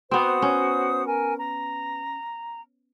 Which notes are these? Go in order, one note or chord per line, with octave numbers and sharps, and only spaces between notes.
B3 C4 F#4 C5 D#6
C#4
A#4 G#5
A#5